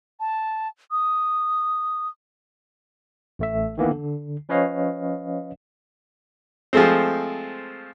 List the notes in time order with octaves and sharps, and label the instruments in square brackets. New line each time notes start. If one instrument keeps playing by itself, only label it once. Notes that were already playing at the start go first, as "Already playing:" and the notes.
[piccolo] A5
D#6
[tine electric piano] A1 A3 E5
D#3 E3 A#3 B3
D3
F3 C#4 B4 C#5 D#5 F5
[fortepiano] F3 G#3 A3 C4